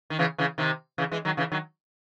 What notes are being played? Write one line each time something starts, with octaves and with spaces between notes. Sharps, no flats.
D#3
C#3 E3
C#3 E3
C3 D#3
C#3 E3
E3 G#3
D#3 F#3
C#3 E3
D#3 F#3